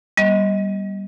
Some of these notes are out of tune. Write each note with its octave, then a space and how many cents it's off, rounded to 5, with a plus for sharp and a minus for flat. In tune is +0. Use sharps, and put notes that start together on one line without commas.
G3 +0 B3 -35 D#5 +20